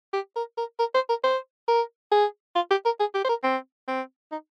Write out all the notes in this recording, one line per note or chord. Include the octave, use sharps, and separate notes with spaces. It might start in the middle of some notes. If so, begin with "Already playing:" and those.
G4
A#4
A#4
A#4
C5
A#4
C5
A#4
G#4
F4
G4
A#4
G#4
G4
C5
A#4
C4
C4
D#4